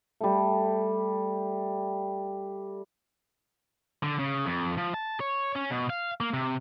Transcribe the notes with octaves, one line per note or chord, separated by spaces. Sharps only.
G3 A3
D3
C#3
F2
F3
A5
C#5
C#4
B2
F5
A#3
C3